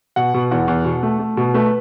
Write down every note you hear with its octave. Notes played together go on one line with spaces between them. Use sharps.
B2 F#5
B2
E2 F#5
E2
B2
A3
A3
B2
A3 B4